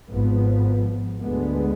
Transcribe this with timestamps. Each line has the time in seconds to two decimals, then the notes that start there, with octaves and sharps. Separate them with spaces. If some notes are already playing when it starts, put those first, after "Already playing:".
0.10 G#1 G#2 F3 B3
1.22 D2 D3 G#3 B3